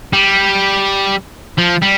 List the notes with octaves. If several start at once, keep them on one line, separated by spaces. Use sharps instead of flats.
G3
F3
G3